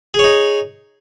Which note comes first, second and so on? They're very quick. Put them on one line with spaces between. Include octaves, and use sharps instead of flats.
G#4 C#5 D#4